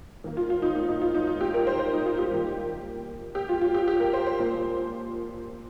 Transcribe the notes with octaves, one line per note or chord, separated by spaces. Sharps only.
D#3 A#3
F4
F4
D#4
D#4
D#4
F4
D#4
F4
G4
A#4
C5
C5
D#4
F4
G4
D#3 G3 A#3
G4
F4
F4
G4
G4
A#4
C5
C5
A#2 F3 A#3